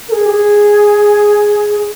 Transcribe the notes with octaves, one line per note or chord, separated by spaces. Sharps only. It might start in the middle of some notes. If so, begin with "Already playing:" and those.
A#4
G#4
G4
G#4